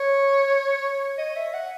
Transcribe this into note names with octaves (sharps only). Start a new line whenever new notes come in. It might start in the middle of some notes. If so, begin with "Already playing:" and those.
Already playing: C#5
D#5
E5
F#5